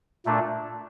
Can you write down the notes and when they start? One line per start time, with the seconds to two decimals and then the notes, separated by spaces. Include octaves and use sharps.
0.25 A#2 A3 D4